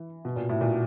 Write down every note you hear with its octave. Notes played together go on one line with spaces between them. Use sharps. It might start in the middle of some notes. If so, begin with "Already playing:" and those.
Already playing: E3
B2
A#2
A2
A#2